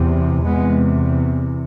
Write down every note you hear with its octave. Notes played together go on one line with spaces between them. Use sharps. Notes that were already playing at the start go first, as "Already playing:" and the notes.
Already playing: E2 C3
E2 C3 G#3 B3